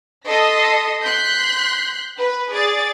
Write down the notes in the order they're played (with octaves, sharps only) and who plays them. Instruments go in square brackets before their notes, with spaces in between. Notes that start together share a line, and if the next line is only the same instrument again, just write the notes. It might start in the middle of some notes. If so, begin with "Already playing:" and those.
[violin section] A4 D#5 C6 D#6 B6
C6 F#6 G6 B6 C7
B4
G#4 D5 A6